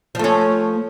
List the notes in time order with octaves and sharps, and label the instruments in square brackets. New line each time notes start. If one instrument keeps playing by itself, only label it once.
[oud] F3
A3
C#4